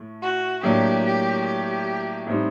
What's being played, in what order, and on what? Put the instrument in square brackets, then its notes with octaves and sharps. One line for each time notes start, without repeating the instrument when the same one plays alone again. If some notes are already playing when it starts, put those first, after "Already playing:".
Already playing: [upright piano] A2 A3
[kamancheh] F#4
[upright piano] A2 F#3 A#3 D4 [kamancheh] G4
[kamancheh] G4
G4
[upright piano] A2 G3 C4 D#4